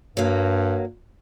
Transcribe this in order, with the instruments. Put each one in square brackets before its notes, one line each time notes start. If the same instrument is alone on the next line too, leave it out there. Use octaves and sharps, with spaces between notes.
[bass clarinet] G2 [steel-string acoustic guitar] F#3 A#3